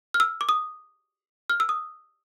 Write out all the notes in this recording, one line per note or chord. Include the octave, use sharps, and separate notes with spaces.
F6
E6
D6
D#6
F6
E6
D#6